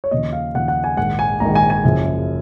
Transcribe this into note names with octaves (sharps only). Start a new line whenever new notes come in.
C#5
D#2 C#3 F3 D#5
F5
D#2 C#3 F3 F#5
F#5
G#5
A#1 G#2 D#3 F#5
G#5
A#1 G#2 D#3 A#5
G#5
G#5
F#1 F#2 C#3 F3